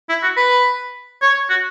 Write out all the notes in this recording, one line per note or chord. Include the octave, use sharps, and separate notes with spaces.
E4
F#4
B4
C#5
F#4